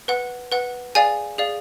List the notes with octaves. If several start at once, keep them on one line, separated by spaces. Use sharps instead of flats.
B4 F#5
B4 F#5
G#4 D5 F5 G#5
G#4 D5 F5